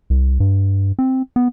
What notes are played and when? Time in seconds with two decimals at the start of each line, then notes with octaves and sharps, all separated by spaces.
0.10 C2
0.40 G2
0.99 C4
1.36 B3